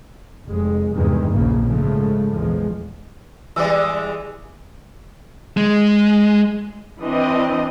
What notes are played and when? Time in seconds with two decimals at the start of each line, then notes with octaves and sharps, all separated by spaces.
0.47 F1 G#3
0.95 E2 G2 C3 D#3 E3 G#3
1.31 A#1 E2 C#3 F3 A#3
1.65 G#2 C#3 F3 G#3 A3
2.33 A#1 E2 F3 G#3
3.56 E3 G3 G#3 D5 E5
5.57 G#3
7.02 E3 C4 D4 D#5